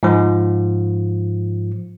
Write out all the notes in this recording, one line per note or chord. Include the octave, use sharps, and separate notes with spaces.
G#2 F3